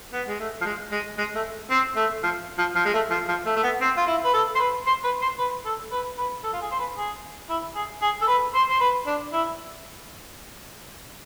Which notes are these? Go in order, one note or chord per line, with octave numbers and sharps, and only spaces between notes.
B3
G#3
A3
F3
G#3
G#3
G#3
A3
C4
A3
F3
F3
F3
G#3
A3
F3
F3
A3
A3
B3
C4
F4
E4
B4
A4
C5
B4
C5
B4
C5
B4
A4
B4
B4
A4
F4
G#4
C5
B4
G#4
E4
G#4
G#4
A4
B4
C5
C5
B4
D4
E4